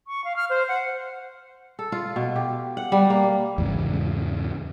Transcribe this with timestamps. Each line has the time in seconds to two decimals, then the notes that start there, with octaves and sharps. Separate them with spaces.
0.07 C#6
0.24 F5
0.36 F6
0.50 C5
0.68 F#5
1.79 A4
1.92 F4
2.16 B2
2.36 G4
2.77 F#5
2.92 G3
3.10 A#3
3.58 E2 G#2 C#3